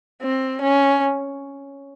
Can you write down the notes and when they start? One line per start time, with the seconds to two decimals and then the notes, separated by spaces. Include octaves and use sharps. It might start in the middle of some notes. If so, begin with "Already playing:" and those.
0.22 C4
0.61 C#4